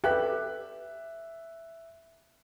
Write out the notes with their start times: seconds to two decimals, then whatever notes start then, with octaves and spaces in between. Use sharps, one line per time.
0.04 G4 A4 B4 E5 F#6